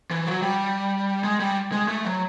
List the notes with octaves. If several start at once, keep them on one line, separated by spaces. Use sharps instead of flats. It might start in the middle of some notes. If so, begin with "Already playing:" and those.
E3
F#3
G3
G#3
G3
G#3
A3
F#3